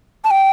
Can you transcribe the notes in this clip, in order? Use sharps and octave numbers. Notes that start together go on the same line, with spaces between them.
A5
G5